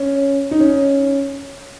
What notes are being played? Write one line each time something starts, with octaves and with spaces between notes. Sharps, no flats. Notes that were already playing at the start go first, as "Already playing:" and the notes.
Already playing: C#4
D#4
C#4